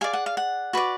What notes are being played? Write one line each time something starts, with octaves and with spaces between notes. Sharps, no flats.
G#4 D5 F5 G#5
F#5
F5
F#5
F#4 B4 D5